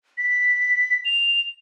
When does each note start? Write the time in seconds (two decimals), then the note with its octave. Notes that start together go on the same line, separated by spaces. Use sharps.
0.18 B6
1.05 F7